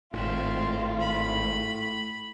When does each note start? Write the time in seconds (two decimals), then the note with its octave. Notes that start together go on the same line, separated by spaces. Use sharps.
0.14 G#1 A2 C4 F4 E5
0.99 B5